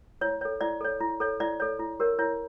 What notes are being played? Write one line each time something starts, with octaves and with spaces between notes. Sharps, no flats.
E4 C#5
A4 C#5
E4 D5
A4 C#5
E4
A4 C#5
E4 D5
A4 C#5
E4
G4 A#4 C#5
E4 C#5